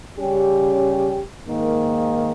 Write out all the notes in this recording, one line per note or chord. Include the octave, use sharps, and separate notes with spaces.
C#3 G3 C#4 G4
G#2 D#3 A#3